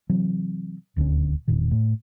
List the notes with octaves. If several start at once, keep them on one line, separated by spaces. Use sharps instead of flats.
C3 E3 F#3 C4
D#1 D2 G2 C#4
E1 A#2 D#3
A2